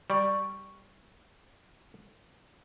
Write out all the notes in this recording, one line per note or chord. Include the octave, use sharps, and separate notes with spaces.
G3 D5 C#6